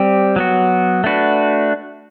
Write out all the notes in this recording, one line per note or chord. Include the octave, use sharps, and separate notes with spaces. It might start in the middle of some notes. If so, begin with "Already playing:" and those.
Already playing: G3 C4 G4
F#3 B3 F#4
A3 D4 F#4 B4